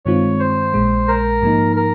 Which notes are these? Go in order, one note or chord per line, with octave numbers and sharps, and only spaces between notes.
G2 D#3 G#3 C4 F4 C#5
C5
A#1 A#2 G#3
A#4
G#2 F3 A#3 D#4
A#4